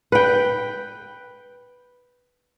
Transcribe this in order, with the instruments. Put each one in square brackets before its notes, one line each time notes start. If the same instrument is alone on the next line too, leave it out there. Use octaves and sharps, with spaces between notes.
[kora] B4 G5